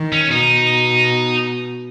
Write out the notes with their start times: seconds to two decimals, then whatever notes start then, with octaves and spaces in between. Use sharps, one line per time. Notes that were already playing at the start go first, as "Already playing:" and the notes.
Already playing: D#3
0.12 C#4
0.31 B2 D#4